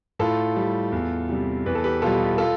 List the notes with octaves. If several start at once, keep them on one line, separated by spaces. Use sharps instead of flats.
A2 F4 A4
G3
E2
C3 G3
E2 B4
A4
G4 B4
B2 G3 F4 A4
F4 A4